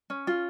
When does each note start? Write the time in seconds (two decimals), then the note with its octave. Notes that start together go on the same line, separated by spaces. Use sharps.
0.10 C#4
0.27 F4